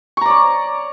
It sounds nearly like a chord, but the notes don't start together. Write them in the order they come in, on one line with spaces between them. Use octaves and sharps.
C#6 A#5 D5 C#5